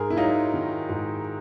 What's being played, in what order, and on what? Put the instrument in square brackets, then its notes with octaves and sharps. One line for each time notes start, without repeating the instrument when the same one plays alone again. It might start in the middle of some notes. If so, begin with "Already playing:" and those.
Already playing: [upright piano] G#2 G#4 A#4
E4
F#3 D#4 F4
D#3
G#2